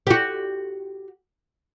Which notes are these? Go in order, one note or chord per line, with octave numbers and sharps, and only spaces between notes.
F#4 G4